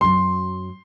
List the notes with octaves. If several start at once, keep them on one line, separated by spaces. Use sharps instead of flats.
F#2 F#3 C6